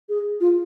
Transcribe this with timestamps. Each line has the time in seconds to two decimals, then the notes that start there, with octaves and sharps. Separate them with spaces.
0.09 G#4
0.40 F4